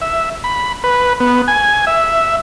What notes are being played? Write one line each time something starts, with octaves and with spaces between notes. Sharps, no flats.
E5
B5
B4
B3
G#5
E5